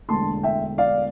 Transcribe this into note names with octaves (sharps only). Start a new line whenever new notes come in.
E1 E2 D3 A3 A5 C6
E5 G5
D5 F5